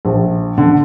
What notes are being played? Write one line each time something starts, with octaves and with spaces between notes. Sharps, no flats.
A#1
D3